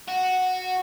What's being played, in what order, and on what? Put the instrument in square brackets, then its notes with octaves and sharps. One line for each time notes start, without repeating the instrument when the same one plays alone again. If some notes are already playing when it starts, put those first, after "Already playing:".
[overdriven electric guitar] F#4